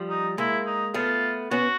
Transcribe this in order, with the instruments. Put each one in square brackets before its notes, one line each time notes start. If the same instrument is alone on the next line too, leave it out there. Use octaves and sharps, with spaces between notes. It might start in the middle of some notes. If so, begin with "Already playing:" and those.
Already playing: [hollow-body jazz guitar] F3 G3
[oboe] D#4
[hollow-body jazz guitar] G#3 A#3 [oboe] E4
[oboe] D#4
[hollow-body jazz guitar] A3 B3 [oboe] F4
[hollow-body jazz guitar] B3 C#4 [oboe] F#4